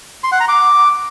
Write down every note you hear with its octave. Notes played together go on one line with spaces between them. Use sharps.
C6
F#5
A#5
D6